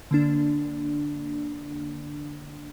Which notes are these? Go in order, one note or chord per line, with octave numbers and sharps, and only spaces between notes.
D3 A#3 D4